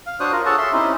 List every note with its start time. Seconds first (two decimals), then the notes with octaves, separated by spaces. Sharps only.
0.06 F5
0.20 D4 F#4 C5 C#5 D#6 F#6
0.32 F4 A#4
0.46 G#4 A4 C#5 F#5 A5
0.58 E5 C6
0.73 C4 C#4 D#4 E4 G4